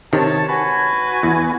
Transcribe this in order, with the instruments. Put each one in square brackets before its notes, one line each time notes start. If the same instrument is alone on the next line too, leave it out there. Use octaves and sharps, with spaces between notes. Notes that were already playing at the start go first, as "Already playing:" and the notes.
[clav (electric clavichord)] C3 D#3 [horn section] C#5 A5
[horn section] F#4 B4 G#5
[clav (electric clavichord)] E2